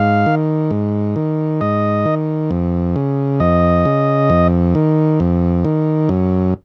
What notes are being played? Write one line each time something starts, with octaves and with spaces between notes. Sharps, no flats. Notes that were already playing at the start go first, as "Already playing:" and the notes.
Already playing: G#2 F5
D#3
G#2
D#3
G#2 D#5
D#3
F2
C#3
F2 D#5
C#3
F2
D#3
F2
D#3
F#2